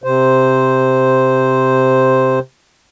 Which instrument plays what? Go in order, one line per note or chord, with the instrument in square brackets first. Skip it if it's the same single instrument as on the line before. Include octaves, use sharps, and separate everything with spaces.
[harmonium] C3 C5